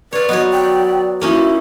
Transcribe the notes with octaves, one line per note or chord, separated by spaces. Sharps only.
F4 B4 C#5 D5
F#3 B3 C#5 D#5
G5
A#3 C#4 D#4 E4 F#4